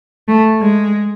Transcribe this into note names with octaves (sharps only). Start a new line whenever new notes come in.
A3
G#3